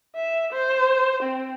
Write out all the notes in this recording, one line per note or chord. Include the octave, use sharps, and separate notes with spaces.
E5
C5
C4